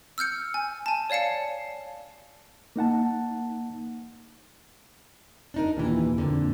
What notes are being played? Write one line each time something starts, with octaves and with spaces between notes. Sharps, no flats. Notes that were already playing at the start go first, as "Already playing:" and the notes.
E6 F6 G6 C#7
G#5
G#5 A5
C#5 D5 F5 A5 C#7
A#3 D#4 F#5 A5
D4 D#4 A#4
D#2 A#2 E3
F2 A#2 D3